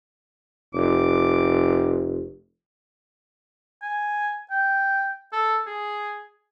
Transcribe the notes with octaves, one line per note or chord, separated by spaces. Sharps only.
F1 D6
G#5
G5
A4
G#4